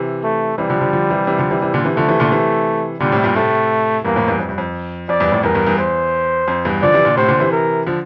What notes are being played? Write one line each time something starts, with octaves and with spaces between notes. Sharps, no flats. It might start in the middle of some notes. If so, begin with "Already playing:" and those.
Already playing: C3 E3
A3
C3 E3 G3
D3 F3
D3 F3
D3 F3
C3 E3
C3 E3
D3 F3
C3 E3
C3 E3
A#2 D3
C3 E3
D3 F3 A3
C3 E3
A#2 D3
C3 E3
A#2 D3 G3
A2 C3
G2 A#2
A2 C3 A3
E2 G2 A#3
F2 A2
E2 G2
F2
G2
F2
F2 D5
E2 G2
F2 A2
E2 G2 A#4
E2 G2
E2 G2
E2 C5
F2
E2 G2
D3 F3 D5
C3 E3
A#2 D3
A2 C3 C5
A#2 D3
C3 E3
A#4
D3 F3